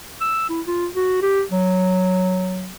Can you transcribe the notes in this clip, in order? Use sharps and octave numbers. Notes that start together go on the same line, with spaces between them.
E6
E4
F4
F#4
G4
F#3